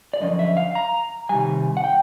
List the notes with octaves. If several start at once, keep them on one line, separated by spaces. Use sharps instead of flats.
D5
F#2 D3 F3 C#4 D#5
E5
F5
A#5
C3 D#3 G3 G#5
F#5
G5